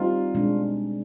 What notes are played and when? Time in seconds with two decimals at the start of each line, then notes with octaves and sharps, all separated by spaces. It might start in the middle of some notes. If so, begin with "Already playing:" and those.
Already playing: G3 C4 D#4 F4
0.35 B2 G#3 D4